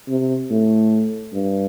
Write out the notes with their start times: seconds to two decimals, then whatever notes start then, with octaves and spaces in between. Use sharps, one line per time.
0.09 C3
0.50 A2
1.33 G2